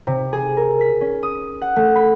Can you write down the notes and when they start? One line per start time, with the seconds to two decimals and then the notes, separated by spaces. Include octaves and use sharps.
0.07 C3
0.33 G#4
0.57 A#4
0.81 B6
1.01 C#4
1.23 D#6
1.62 F#5
1.76 A3
1.95 B5